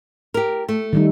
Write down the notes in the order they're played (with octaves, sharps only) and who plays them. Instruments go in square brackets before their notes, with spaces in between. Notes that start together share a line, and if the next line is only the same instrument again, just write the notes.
[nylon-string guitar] G4 A#4
A3
[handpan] D#3 G3 D#4